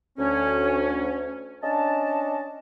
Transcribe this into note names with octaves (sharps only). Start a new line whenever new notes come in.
D2 C#4
C#4 D4 D#5 A5